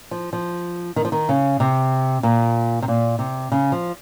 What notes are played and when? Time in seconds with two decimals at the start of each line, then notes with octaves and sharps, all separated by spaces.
0.11 F3
0.33 F3
0.96 D#3
1.05 F3
1.12 D#3
1.29 C#3
1.60 C3
2.23 A#2
2.82 C3
2.88 A#2
3.19 C3
3.52 C#3
3.72 F3